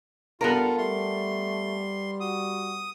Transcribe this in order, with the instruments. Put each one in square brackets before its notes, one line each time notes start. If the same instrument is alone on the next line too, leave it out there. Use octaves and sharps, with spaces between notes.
[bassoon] G2 [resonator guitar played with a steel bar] B3 A4 A#4 [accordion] F4
[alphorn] G3 [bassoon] A3 [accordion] C6
[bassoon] F#4 [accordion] D#6